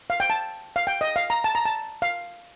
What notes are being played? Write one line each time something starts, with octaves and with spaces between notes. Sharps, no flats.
F5
G5
A5
F5
G5
D#5
F5
A#5
A5
A#5
A5
F5